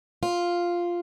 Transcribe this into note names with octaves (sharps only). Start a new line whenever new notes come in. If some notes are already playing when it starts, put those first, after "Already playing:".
F4